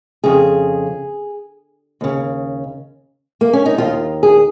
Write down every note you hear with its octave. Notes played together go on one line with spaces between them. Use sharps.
F2 C#3 G#4
D#2 C#3
A#3
C#4
D#4
D#2 D#3 F4
G#4